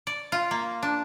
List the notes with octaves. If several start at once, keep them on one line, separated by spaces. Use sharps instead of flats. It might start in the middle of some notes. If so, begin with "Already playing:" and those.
D5
F4
A#3
D4